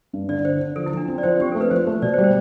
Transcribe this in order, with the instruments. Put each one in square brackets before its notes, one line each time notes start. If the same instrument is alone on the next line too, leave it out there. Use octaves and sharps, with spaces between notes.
[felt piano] G2
[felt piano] D3 [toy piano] D5
[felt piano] D3 [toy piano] C5
[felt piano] D3
[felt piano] F3 [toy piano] A4
[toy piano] E4
[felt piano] F3 [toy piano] D4
[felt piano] C4
[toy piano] D5
[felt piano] F3 [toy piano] C5
[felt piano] C4 [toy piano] G4
[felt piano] A3 [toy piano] A4
[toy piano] B4
[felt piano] F3 [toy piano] C5
[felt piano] A3
[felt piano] B2 [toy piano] D5
[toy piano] C5
[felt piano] G3
[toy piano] C5